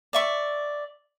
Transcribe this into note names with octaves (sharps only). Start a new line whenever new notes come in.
D5 E5 C#6